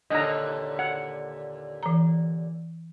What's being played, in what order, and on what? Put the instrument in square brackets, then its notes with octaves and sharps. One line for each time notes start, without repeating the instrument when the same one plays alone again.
[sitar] D#2 A#2 D3 [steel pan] D#5 A#5
[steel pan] F#5
[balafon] E3 A#5